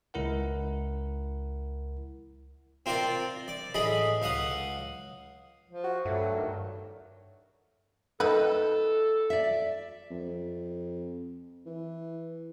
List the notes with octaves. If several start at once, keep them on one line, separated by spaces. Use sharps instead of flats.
C#2 E4 A#4 F#5
C4 F4 A#4 D5
D5
A1 G#4 D#5 B5
C#2 F5 F#5 D#6
F3
F#4
G2 F#3 A3
D#3
D#3 A3 A4 B4 D#5
D5 E5
F2
E3